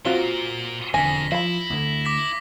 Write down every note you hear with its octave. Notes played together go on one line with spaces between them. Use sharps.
A#2 C4 F4 F#4 A#4 G7
E1 F2 D3 G#5 A#6 B6
F3 E4 F5 B5
D2 D3
D6 A#6 B6